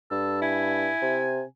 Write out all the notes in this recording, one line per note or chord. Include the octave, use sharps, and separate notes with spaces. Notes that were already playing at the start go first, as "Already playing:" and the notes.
G2 A4
E4 G#5
C3